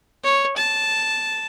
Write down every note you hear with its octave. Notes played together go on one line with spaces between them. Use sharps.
C#5
A5